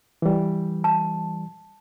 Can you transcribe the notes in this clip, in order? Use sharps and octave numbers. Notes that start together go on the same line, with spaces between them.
E3 G3
A5